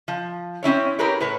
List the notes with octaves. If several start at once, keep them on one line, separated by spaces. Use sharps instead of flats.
F3
C4 C#4 E4 C#5
E4 G4 G#4 A#4 B4 C#5
A2 B4 C#5